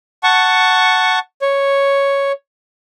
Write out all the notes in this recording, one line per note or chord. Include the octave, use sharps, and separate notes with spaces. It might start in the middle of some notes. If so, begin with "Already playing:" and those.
F#5 A5 C#6
C#5